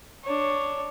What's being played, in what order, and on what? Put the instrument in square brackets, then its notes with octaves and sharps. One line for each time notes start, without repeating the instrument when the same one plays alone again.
[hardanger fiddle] D4 C#5